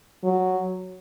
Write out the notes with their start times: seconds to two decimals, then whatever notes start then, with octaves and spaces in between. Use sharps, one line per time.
0.24 F#3